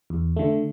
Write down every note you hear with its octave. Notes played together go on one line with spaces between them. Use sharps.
E2
D3 A3